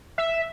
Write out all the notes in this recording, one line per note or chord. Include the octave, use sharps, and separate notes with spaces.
E5